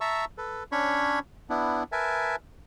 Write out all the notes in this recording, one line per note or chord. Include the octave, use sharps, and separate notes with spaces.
E5 A5 A#5 C#6 E6
A4 B4
C#4 D4 C#5 B5 C#6
B3 D4 E4
A#4 B4 E5 G#5 A5